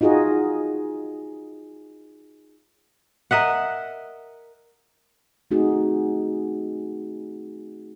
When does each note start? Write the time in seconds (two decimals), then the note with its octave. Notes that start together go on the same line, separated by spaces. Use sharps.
0.01 D#4 F4 F#4 G#4 D#5
3.31 A#4 D#5 E5 F#5
5.51 A3 C4 D#4 F#4 G#4